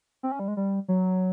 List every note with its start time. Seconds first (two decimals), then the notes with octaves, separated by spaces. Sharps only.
0.23 C4
0.32 C#4
0.39 G3
0.48 G#3
0.57 G3
0.88 F#3